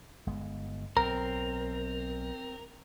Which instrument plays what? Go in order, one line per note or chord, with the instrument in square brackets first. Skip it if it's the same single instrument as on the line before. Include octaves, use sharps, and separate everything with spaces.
[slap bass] G1 G#3 B3
[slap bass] B1 [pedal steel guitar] C4 [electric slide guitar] A#4 [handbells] A#5